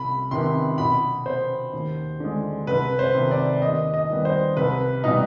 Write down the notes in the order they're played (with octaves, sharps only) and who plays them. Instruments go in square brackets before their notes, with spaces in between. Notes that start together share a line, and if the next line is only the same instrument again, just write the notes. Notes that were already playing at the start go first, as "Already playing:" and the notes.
Already playing: [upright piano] C2 B5
C3 D#3 B3 C6
B2 B5
B3 C5
D#2
D3 G#3
C2 B4
C5
C3 D#3 B3
D5
D#2 D#5
D#5
D#3 G3 B3
C5
C2 B4
B2 G3 B3 D#4